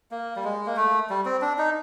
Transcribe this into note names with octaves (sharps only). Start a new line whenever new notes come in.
A#3
G3
G#3
A#3
A3
G3
C4
D4
D#4